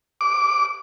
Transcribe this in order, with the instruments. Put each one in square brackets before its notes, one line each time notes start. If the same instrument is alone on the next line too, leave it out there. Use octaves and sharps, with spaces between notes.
[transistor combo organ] D6